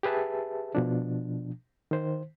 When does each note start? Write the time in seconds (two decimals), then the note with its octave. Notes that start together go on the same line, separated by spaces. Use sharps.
0.03 G4 G#4 B4 E5 A5
0.75 B2 F3 D4
1.91 D#3 C5